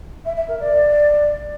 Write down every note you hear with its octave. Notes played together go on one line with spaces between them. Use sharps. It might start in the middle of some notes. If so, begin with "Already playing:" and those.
E5
E5
A#4
D5